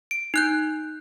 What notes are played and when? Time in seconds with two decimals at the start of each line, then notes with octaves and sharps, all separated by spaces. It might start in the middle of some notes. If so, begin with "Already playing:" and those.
0.11 D7
0.34 D#4 F#6 G6